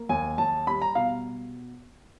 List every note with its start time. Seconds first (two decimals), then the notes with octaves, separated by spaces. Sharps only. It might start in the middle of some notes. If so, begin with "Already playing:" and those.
Already playing: A#3
0.09 D#2 G#5
0.38 D#2 A5
0.67 G3 B5
0.82 A#5
0.95 B2 F5